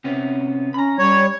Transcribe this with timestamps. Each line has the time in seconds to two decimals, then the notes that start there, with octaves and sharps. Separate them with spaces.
0.04 C3 B3 C#4
0.74 C#4 A#5 B5
0.99 G3 C#5